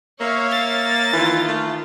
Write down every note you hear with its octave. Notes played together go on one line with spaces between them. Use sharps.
A#3 C#5 E5 F5
A6
D#3 E3 F4
A3